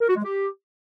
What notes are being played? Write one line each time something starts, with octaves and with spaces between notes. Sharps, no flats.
A#4
F#4
G#3
G4